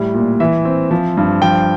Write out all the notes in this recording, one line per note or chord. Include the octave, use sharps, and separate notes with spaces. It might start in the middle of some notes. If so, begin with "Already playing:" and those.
Already playing: A2 G3
A#2
E3 E5
C4
F3
G2
F3 G5